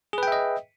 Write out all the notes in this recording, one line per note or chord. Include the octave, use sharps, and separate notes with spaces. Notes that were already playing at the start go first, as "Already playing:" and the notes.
G#4 B4 D#5 E5 G5